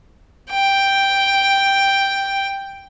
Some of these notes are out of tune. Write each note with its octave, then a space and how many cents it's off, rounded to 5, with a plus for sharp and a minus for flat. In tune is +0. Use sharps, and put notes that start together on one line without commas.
G5 +0